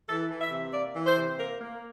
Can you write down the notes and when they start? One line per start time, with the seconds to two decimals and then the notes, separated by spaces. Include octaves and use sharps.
0.08 E3 A4
0.30 E3
0.41 E5
0.51 C3
0.73 A#3 D5
0.95 E3
1.06 C5
1.16 C3
1.38 A#3 A#4
1.60 A#3